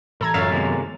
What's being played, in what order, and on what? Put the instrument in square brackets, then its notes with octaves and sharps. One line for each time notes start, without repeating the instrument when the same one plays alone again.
[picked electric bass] A2 E3 [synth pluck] A4 A#5 G#6
[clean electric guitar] C#2 E5 F5 [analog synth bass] F#2 [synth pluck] C#5 A6
[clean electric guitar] C3 G#3 A#3 [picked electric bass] D#3 B3